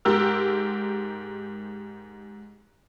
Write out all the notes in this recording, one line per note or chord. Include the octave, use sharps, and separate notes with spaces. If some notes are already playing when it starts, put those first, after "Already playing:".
G#2 G4 A#4 E6